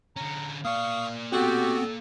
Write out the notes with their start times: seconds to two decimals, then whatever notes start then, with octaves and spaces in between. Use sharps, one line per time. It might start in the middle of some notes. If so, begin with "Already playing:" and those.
0.16 D3 C#4 A#5
0.65 A#3 D5 F5 C#6 D#6
1.32 B3 C4 F#4 G4 A4